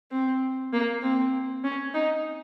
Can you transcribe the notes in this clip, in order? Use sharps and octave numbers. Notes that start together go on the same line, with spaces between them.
C4
A#3
C4
C#4
D#4